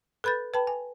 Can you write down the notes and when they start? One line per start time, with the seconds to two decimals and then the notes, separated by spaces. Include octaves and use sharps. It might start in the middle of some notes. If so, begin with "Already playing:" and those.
0.24 A4 B4 B5 G6 A6
0.54 B4 G5 A5 B5
0.67 G#5